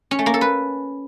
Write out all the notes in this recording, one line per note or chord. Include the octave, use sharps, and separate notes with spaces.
C#4
A3
A#3
A4
B4